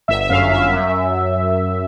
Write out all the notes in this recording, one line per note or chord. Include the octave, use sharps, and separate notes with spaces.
G1 E5
E5
F#2 F5
F#2 E5
F#2